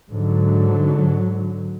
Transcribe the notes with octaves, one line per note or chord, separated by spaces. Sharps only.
G#2 D3 F#3